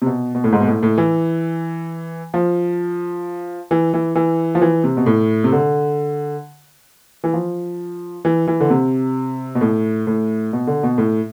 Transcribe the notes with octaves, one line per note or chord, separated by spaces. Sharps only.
C3
B2
B2
A2
G#2
B2
A2
A2
E3
F3
E3
E3
E3
F3
E3
C3
B2
A2
C3
D3
E3
F3
E3
E3
D3
C3
B2
A2
A2
B2
D3
B2
A2